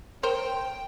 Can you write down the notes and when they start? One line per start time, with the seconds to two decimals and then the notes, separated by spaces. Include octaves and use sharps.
0.23 A#4 C5 C#5 G5